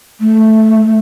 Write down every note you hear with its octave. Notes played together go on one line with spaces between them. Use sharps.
A3